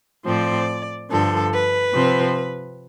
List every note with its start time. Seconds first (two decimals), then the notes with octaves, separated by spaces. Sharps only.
0.25 A2 F3 C4 D5
1.09 G2 D3 F3 A4
1.52 B4
1.93 C3 F3 C4